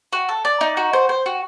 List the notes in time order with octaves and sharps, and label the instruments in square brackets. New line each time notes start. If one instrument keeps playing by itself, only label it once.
[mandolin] F#4
A4
D5
D#4
F#4
C5
C5
F#4